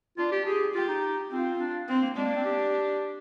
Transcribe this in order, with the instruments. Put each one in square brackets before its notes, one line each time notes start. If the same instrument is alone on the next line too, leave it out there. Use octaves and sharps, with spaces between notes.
[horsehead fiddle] D4 [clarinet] F4
[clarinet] G4
[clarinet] G4 [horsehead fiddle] G#4
[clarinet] F4 [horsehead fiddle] G4
[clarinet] D#4
[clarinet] C4 [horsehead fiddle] F4
[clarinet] D4
[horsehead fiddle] C4
[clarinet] A#3
[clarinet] G#3 [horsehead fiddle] D4
[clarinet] A#3
C4
G4